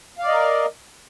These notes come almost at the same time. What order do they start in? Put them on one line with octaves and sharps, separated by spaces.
F5 D5 D#5 A#4